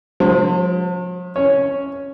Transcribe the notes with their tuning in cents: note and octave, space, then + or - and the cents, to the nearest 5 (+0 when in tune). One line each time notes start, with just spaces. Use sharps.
F3 +45 C5 -15
C#4 +0 C#5 +0